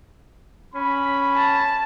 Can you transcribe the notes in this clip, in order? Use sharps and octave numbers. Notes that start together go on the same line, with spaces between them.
C#4 B5
A5